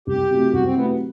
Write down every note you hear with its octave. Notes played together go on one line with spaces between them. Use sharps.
C2 G4
C3 F#3 A3 E4
C2 F#4
C4
C3 F#3 A3 B3 E4